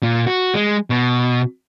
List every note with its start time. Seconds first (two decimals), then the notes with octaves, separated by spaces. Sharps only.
0.03 A#2
0.27 F#4
0.55 G#3
0.90 B2